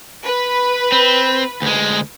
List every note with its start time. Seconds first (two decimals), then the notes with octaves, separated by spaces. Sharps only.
0.24 B4
0.92 C4
1.62 D2 G#3